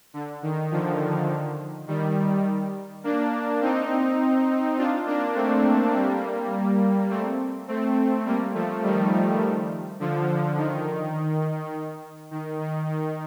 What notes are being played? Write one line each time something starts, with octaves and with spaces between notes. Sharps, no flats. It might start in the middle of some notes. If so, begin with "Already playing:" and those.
D3
D#3
D3 F3
D#3 G3
A#3 D4
C4 D#4
D4 F4
A#3 D4
A3 C4
G3 A#3
A3 C4
A3 C4
G3 A#3
F3 A3
D#3 G3
D3 F3
D#3
D#3
D#3
D#3